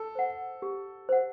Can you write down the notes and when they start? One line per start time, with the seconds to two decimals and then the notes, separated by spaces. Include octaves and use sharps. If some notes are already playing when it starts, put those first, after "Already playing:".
Already playing: A4
0.15 C5 F#5
0.62 G4
1.09 C5 F#5